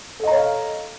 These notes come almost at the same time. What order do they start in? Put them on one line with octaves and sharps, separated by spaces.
A4 D#5 A#5 C#5 F5